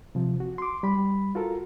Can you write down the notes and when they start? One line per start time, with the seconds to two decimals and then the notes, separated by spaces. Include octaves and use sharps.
0.15 C3 F3
0.40 F#4
0.58 C6 D6
0.83 G3 B5
1.35 F4 F#4 A4 A#4